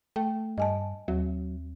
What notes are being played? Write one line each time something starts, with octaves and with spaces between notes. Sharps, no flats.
A3 G5
G2 D#5 G#5 A5
D#2 F#3